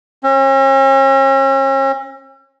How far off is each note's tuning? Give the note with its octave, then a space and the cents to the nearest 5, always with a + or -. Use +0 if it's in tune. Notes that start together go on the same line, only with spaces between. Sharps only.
C#4 -40